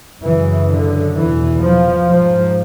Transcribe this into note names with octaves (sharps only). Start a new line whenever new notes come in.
F#2 C#3 E3
D3
E2 B2 E3
F3
G#2 F3